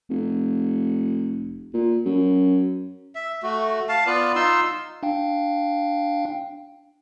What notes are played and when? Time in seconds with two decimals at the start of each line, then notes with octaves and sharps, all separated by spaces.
0.10 F1
1.74 A#2
2.06 F#2
3.15 E5
3.43 A3 F#4
3.89 F5 A5
4.07 B3 F4 B4 D5
4.36 D#4 F4 C6 E6
5.03 D4 F5 G5